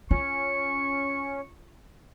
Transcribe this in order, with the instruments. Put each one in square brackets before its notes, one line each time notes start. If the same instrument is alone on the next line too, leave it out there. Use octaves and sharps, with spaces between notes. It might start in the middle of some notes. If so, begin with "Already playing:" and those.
[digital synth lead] C#4 [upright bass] F4 [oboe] C#6